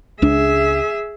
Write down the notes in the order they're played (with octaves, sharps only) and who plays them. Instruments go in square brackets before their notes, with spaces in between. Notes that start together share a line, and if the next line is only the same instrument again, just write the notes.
[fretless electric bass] C#2 D4 [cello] G#4 E5